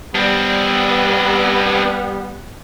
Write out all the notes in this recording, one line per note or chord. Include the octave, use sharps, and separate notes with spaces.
G3 B3 C4 D4